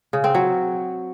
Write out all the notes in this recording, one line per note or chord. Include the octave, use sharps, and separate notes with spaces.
C#3
C4
F#3